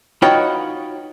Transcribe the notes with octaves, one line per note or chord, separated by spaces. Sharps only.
D#4 F4 F#4 B4 C#5 G5